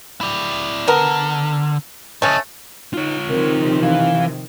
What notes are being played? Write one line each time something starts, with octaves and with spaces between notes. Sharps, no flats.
E4 D5
D3 B3 A#4
A2 A3 C#4 D#5
D#4 F4 C#5
C3 D#3 F3 A#4
E3 F5